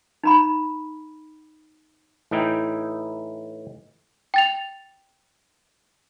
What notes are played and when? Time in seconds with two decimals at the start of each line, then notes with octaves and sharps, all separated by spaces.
0.23 D#4 A#5 B5
2.31 A2 E3 D#4 E4 G5
4.34 G5 A6 F7